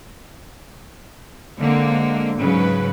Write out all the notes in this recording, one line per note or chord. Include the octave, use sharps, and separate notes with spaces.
D3 G#3 A#3 C4
G#2 C#3 F#3 C#4 B4